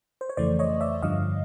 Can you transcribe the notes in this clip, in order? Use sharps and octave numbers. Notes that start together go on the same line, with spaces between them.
C5
C#5
F2 C#3 E3 A3 C5 D5
C#5 D#5
D5 E5
G2 D3 F3 D#5 F5